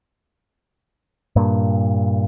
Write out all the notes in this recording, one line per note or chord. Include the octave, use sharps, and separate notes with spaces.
G2 A#2